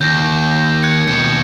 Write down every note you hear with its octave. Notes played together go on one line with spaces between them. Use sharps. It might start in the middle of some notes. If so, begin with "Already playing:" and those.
D#2 G6 A#6
F#6 G#6 C#7
D#2 B2 C#7